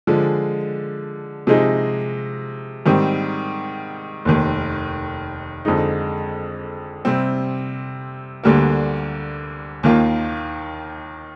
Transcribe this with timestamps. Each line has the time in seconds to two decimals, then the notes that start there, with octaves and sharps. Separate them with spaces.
0.07 D3 F3 G#3
1.47 C3 F3 G#3 D#4 G#4
2.86 G#2 D#3 G3 C4
4.25 F1 D#2 D#3
5.65 F2 D3 G#3 D#4
7.05 C3 G3 C4
8.44 D2 D3 G3 A#3
9.83 D#2 D#3 A#3 F4